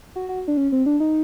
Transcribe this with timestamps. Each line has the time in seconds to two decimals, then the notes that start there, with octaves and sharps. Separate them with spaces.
0.16 F#4
0.29 F#4
0.48 D4
0.57 C#4
0.72 C4
0.86 D4
1.00 D#4